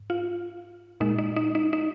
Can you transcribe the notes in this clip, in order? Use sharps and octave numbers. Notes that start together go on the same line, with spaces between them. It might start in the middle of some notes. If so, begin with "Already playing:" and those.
Already playing: G#2
F4
A#2 G#3 D#4
D#4
D#4
D#4
D#4